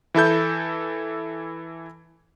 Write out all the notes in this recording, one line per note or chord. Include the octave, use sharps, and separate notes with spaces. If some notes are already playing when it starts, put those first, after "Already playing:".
E3 E4 A4 G6